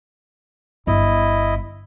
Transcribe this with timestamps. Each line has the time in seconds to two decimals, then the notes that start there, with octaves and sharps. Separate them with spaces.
0.87 G1 E4 D#5